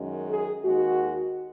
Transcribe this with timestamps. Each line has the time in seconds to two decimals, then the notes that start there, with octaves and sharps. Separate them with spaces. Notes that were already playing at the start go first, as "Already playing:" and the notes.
Already playing: F#2 D#3 G#3
0.29 G#4
0.64 D#2 D#3 G#3 F#4